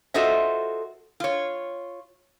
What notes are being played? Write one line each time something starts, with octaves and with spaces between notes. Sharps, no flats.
F4 F#4 A4 C5 D#5 E5
F4 C#5